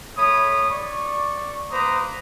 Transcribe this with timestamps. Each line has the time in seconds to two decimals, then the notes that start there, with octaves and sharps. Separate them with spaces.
0.18 A3 C#5 B5 D#6
0.71 D5 C#6
1.71 A#3 B4 C5 A#5 D6 D#6